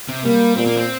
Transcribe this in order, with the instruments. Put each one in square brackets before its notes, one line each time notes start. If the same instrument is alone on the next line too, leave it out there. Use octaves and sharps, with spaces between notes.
[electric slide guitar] C3
[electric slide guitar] G3 [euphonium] A#3
[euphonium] A#2 [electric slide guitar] C4
[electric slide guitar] A#3
C4